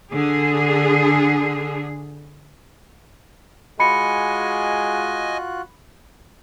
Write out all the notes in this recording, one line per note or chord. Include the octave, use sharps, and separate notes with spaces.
D3 G#4
G#3 F4 F#4 D#5 G#5 B5 F#6 C#7